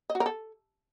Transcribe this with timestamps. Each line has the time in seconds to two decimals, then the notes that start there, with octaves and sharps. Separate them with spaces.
0.10 D#5
0.15 F#4
0.20 A#4
0.26 A4